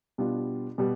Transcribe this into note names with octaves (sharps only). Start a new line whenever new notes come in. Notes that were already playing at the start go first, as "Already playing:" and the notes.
B2 G3 B3 D4 F4
B2 G3 B3